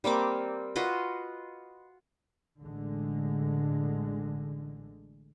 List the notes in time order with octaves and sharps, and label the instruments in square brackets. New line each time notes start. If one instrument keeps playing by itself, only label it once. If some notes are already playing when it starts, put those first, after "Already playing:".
[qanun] G3 A#3 C4 D6
F4 F#4 B4 D#5
[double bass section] A1 D3 G#3